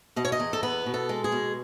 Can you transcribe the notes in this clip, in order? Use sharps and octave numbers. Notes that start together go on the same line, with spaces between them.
B2 D#5
C#5
D#5
E2
A4
B3 B4
B2
A4
G#3
G#4
B2